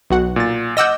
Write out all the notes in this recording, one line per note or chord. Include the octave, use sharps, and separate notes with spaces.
B1 F#4 F#5
A#2 A6
D#5 F#5 D6 E6 G6 A#6